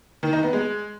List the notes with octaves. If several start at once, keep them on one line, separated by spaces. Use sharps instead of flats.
D#3
D#4
B3
G#3